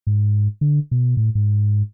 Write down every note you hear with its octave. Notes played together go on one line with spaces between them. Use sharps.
G#2
D3
B2
A2
G#2